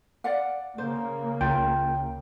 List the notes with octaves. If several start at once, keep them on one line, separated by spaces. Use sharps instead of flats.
D5 F5 F#5
C#3 A#3 C5
C#2 F4 G5